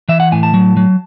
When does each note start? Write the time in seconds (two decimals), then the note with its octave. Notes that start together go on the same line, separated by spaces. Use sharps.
0.09 E3 E5
0.20 F#5
0.32 A2 G#5
0.43 A5
0.54 F#3
0.77 F#3